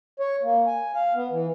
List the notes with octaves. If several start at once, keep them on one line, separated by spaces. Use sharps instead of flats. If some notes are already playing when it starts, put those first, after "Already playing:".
C#5
A#3
G#5
F5
B3
E3